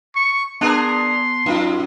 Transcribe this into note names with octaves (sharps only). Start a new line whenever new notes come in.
C#6
B3 D4 G#4 A#4 A5 C6 F#6
F#2 D#4 F4